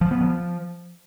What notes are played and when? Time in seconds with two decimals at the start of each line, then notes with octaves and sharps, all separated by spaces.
0.01 F3
0.11 B3
0.21 F3